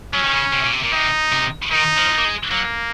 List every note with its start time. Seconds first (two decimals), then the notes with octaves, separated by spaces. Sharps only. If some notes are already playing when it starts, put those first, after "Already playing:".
0.14 F#3 C#4
0.24 D#3
0.34 C#3
0.53 C3
0.64 A#2
0.73 C3
0.84 A#2
0.93 C3 D#4
1.32 C3
1.72 D#3 D#4
1.98 F3
2.18 A#3
2.25 G#3
2.51 F#3 A#3